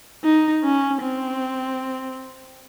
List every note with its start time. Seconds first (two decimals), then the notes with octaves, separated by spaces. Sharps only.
0.24 D#4
0.64 C#4
1.03 C4